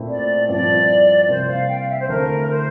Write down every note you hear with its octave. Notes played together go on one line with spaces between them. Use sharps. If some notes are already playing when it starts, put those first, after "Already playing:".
Already playing: A#2 A3 C4 E4
D5
G2 F3 C4 E4 D5
C3 G3 A#3 E4 C5
F5
G5
F5
E5
C5
D3 A3 C4 E4 A#4
C5